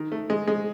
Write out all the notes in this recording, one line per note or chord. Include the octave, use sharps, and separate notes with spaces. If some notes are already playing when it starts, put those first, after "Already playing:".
Already playing: D#3
A3
G#3
G#3